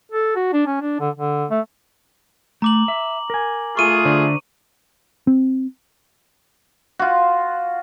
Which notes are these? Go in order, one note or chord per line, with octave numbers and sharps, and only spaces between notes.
A4
F#4
D4
C#4
D4
D3
D3
A3
A3 A#5 D6 F#7
E5
A#4 G#5
A3 F4 G#4 C#6 D#7
D3 C5 D5
C4
F4 F#4